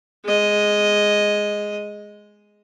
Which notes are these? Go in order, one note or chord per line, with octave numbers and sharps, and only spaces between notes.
G#3 D#5